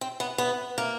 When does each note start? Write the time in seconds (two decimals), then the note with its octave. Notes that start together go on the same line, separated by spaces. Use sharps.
0.01 C4
0.20 B3
0.38 B3
0.78 A#3